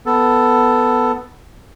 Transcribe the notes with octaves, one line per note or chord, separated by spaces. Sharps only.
B3 A4